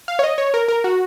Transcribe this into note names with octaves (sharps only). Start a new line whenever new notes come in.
F5
C#5
D#5
C#5
A#4
A#4
F#4